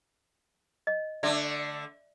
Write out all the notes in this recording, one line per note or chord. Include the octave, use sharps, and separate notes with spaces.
D#5
D3 A3 D5 E5